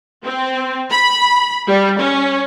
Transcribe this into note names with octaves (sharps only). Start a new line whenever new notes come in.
C4
B5
G3
C#4